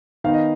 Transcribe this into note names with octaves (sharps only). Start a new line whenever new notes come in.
D#3 B3 D#4 F5
D#5